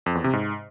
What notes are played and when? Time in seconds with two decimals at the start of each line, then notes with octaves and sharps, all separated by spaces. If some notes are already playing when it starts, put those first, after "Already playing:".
0.06 F2
0.15 E2
0.24 C3
0.33 G#2